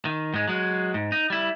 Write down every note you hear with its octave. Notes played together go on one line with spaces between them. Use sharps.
D#3
G#2 G#3
F#3 G#3
G#2
D#4
G3 E4